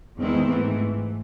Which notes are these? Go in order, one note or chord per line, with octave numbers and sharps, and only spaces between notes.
E2 D#3 G#3 C4 E4
G#2 E3 A3